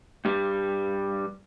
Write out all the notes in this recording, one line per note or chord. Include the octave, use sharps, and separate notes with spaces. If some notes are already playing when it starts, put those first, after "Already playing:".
G2 G3